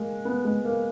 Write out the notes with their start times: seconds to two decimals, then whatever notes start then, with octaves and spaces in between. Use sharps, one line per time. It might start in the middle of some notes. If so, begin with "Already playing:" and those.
Already playing: G#3 A#3
0.25 B3
0.45 G#3
0.65 A#3